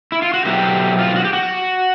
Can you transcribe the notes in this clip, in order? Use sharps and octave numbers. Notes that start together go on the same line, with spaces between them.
E4
F4
F#4
B2 F#3 A3 C4 E4 G4
F4
F#4
G4
F#4